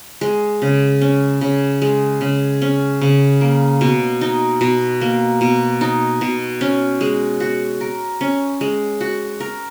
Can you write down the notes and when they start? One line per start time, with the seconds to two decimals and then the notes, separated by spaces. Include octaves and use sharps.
0.21 G#3
0.62 C#3
1.01 C#4
1.41 C#3
1.82 G#3
2.21 C#3
2.62 C#4
3.01 C#3
3.41 A#3
3.81 B2
4.21 D#4
4.61 B2
5.01 A#3
5.41 B2
5.81 D#4
6.21 B2
6.61 C#4
7.01 G#3
7.40 F#4
7.81 A#4
8.21 C#4
8.61 G#3
9.00 F#4
9.40 A#4